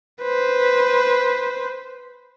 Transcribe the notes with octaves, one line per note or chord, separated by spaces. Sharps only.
B4 C5